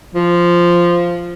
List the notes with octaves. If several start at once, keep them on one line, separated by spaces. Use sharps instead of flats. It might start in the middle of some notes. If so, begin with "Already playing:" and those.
F3